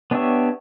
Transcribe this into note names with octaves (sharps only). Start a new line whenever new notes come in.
B3 D4 G4 C#5 E5